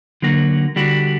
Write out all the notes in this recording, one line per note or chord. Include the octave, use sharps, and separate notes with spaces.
D3 F#3 A#3 F#4
D3 G3 D4 F#4